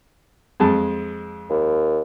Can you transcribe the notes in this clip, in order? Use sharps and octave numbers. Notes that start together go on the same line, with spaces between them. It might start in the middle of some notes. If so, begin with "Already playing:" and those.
F2 G#3 A5
D#2